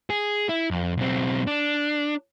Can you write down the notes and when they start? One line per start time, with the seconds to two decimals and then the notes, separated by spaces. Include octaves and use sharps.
0.10 G#4
0.49 E4
0.71 F2
0.98 B1 C4
1.47 D4